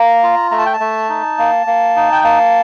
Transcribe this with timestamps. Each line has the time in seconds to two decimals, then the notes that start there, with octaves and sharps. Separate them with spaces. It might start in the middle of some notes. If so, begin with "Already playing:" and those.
Already playing: A#3 A#5
0.23 F4
0.51 A3 A#5
0.59 A5
0.66 G5
0.73 A5
0.80 A3
1.09 D#4
1.39 A#3
1.67 A#3
1.96 D#4
2.12 G5
2.24 A#3 A5